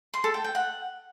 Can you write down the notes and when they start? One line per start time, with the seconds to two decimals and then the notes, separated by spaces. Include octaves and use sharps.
0.14 C6
0.24 A4
0.34 G5
0.44 G5
0.55 F#5